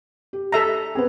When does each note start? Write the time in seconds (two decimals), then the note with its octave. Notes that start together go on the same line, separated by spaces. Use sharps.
0.33 G4
0.52 A4 E5 A#5
0.95 B3 C4 G#4